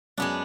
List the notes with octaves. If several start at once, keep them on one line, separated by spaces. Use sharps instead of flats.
F#2 G#3 B3 D4